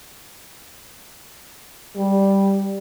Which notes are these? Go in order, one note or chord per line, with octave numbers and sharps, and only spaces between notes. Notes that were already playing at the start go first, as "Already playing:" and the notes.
G3